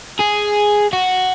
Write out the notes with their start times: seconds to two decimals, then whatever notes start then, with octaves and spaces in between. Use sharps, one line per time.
0.20 G#4
0.93 F#4